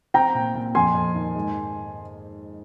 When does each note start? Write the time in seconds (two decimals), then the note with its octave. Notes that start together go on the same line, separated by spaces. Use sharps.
0.14 C4 G5 A#5
0.35 A#2
0.55 A#2
0.75 F2 G#5 C6
0.95 F2
1.15 D#3
1.35 G#2